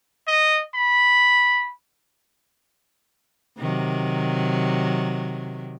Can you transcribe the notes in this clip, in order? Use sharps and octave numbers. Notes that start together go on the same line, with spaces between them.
D#5
B5
C3 D#3 F#3